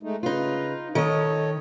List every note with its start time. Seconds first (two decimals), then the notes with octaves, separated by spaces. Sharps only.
0.03 G#3 A3 D#4
0.23 C#3 D#4 F4 B4
0.95 D#3 A4 C#5 D#5